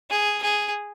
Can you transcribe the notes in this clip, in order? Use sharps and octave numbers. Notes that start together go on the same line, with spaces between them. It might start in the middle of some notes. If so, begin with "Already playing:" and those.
G#4
G#4